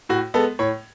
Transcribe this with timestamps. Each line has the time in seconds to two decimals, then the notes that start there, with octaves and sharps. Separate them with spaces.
0.09 A2 F#4
0.34 G#3 B3 A4
0.59 A2 C#5